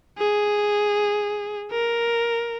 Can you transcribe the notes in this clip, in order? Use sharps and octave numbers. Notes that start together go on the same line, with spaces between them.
G#4
A#4